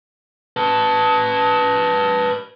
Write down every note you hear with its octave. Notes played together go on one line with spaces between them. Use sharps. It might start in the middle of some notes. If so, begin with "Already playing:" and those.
B4 A5